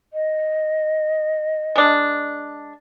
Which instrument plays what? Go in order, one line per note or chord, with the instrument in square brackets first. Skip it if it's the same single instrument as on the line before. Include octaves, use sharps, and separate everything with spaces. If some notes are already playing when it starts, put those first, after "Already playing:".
[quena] D#5
[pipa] G#3 D4